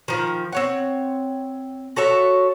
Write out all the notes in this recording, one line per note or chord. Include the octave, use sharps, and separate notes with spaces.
D#3 F3
C4 C#5 F#5
F#4 A4 C#5 E5